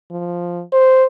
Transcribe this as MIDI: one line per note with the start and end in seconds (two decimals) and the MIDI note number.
0.11 0.63 53
0.72 1.05 72